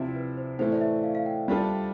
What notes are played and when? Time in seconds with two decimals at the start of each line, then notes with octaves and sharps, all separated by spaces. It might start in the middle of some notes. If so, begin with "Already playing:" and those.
Already playing: C3 F3 C4 E4 C5 D5 F5
0.16 B4
0.37 C5
0.59 A2 E3 A3 C5
0.72 D5
0.81 E5
1.04 F5
1.15 F5
1.26 G5
1.48 G3 D4 F4 A4